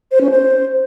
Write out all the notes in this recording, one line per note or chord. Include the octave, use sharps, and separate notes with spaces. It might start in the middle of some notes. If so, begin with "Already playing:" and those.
C5
C#4
C5